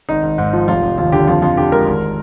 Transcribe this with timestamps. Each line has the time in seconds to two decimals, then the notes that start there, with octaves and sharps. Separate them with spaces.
0.09 G#1 D#4
0.23 G#1
0.38 G#2
0.53 F3
0.68 F1 F4
0.82 F1
0.97 D#2 F4
1.12 D3 G4
1.27 F2 F4
1.42 F2 F4
1.57 D3 G4
1.72 G#3 A#4
1.86 G#1